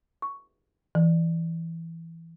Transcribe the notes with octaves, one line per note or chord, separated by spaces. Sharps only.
C#6
E3